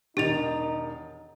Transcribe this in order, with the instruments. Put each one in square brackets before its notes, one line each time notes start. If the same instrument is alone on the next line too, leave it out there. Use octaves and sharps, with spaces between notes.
[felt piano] E1 D#3 A6 [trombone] D#4 [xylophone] G4 F7